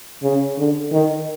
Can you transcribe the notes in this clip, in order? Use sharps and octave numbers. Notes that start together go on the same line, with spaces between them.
C#3
D3
D#3